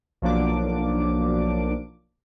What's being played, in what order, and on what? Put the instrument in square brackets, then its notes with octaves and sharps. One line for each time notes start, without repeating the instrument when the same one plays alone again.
[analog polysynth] B1 F3 F#3 A#3 D4 D6